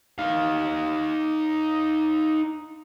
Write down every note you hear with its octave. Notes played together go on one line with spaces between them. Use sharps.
D#4 F5